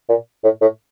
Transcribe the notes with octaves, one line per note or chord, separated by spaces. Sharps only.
A#2
A2
A2